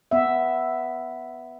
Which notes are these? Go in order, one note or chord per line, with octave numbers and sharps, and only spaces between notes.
B3 E5